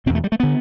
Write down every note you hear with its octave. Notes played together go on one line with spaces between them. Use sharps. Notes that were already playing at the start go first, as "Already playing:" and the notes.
E2 B2 C4
A3
G3
A3
D3 B3